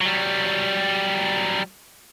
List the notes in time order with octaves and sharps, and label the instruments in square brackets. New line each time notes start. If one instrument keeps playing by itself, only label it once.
[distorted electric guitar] F#3 G3